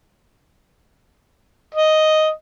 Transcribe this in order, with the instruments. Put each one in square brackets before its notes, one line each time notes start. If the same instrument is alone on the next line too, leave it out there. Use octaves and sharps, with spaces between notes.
[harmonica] D#5